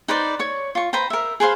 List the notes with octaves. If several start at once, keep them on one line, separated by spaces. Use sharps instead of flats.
D#4 B4 C5 D5
C#5 C#6
F4 C#6
B4 C5 G5 A#5
A#4 E5
G#4 B4 C5 F5